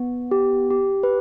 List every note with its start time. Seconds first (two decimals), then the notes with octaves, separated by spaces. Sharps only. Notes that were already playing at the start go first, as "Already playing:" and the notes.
Already playing: B3
0.31 G4
0.70 G4
1.03 B4